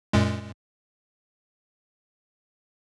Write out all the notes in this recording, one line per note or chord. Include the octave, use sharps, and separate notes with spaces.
F#2 A#2 G#3